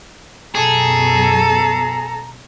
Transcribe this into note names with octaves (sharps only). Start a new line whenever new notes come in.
F#2 B2 G#4 A4 A#5